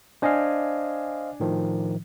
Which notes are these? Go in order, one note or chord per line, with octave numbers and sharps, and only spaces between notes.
D4 C5 D#5 F5 G#5
A2 D#3 F3